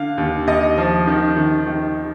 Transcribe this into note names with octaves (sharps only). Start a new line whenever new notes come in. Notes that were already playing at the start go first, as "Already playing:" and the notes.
Already playing: D3 F5
D#2
D#2 D#5
F3
D#3
D#3
D#3